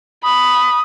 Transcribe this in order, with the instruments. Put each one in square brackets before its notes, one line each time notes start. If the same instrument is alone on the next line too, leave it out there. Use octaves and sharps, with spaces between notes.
[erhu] B5 [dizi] D#6